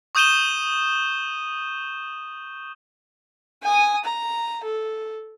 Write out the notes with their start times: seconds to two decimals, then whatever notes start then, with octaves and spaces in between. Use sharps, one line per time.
0.15 C#6 D#6 G6 D#7 E7 G7
3.63 G#5 D#6
4.04 A#5
4.64 A4